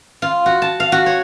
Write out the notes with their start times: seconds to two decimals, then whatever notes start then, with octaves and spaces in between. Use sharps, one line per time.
0.22 F4
0.46 F#4
0.62 A5
0.80 F5
0.92 F#4
1.06 C#5